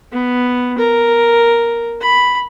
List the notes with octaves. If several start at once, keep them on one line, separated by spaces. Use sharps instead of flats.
B3
A#4
B5